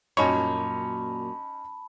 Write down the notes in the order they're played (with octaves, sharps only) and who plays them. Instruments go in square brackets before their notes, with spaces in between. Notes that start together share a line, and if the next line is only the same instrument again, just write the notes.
[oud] F#2 A#2 [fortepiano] C#4 D#4 C#5 [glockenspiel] A5 B5